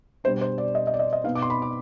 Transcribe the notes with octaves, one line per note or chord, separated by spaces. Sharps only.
B2 G3 D4 C5
C5
D5
D#5
D#5
D5
D#5
D#5
B2 B3 D#4 F5
D6
C6
B5
D6